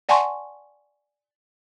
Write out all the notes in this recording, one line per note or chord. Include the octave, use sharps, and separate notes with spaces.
D5 F#5 G#5 A5 C6 C#6